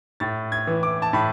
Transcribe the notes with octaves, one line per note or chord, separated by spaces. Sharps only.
A2 A6
G#6
E3
D6
A5
A2 B5